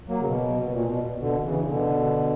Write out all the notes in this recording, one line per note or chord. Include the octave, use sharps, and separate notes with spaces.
F#3 A#3
C#3
B2
B2
A#2
B2
B2 D3
C#3 E3
C#3
B2 D3